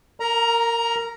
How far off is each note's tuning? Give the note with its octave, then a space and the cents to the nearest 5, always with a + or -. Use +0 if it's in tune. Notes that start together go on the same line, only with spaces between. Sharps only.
A#4 -20 A#5 +10